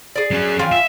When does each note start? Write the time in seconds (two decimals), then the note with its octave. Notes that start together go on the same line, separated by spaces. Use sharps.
0.16 G#4 D5
0.31 F#3 C#4
0.59 F4 G4 G#5
0.72 E5